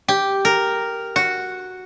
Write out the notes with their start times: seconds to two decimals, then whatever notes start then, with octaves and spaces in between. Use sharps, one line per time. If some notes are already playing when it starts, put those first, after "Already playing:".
0.08 G4
0.45 A#4
1.16 F#4